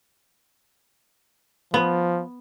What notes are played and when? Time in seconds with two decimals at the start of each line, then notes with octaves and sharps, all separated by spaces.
1.74 F3 B3